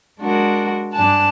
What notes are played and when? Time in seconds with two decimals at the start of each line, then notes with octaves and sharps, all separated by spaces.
0.19 G#3 D4 F#4 A#4
0.92 G2 D4 G#5 A5 F#6